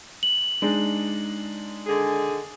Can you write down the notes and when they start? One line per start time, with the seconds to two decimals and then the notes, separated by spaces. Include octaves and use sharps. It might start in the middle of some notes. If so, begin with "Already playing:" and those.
0.23 F#7
0.62 G#3 D4 D#4
1.86 D3 D#3 G#4